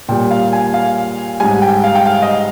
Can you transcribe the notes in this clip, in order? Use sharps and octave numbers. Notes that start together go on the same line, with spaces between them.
A#2 G3 G5
F5
G#5
F5
G#2 G3 G#5
G5
F5
G5
F5
D#5